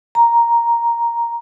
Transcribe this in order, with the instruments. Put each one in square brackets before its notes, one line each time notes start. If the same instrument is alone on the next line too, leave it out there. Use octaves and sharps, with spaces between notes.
[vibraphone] A#5